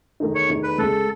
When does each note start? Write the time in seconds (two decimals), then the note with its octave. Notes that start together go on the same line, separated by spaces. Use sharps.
0.20 E2 D#3 A3 D#4
0.35 C#5
0.49 E2 D#3 A3 D#4
0.63 B4
0.78 C#2 C#3 G#3 A4